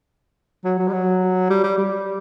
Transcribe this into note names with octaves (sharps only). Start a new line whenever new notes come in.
F#3
F#3
G3
F#3
G3
G3
G3